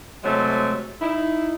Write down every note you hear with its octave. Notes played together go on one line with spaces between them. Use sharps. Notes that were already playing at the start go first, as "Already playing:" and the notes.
C3 F#3 G#3 A3
D#4 E4